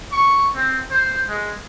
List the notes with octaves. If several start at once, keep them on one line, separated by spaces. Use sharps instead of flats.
C#6
C4
C5
G#3